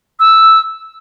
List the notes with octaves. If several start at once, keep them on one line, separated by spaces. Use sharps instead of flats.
E6